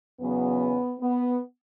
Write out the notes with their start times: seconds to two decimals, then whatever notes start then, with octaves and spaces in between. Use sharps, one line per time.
0.20 E2 C#3 F#3 B3
1.00 B3